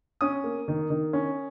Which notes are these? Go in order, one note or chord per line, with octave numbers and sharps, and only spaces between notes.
C#4 D#6
A#3
D#3
D#3
C#4